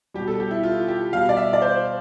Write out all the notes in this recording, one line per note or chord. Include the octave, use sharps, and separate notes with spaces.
B2 G3 G4
A4
G4
E4
F4
G4
B2 G3 F5
D5
E5
D5
C5